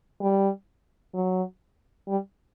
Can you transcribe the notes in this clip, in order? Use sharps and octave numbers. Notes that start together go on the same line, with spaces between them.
G3
F#3
G3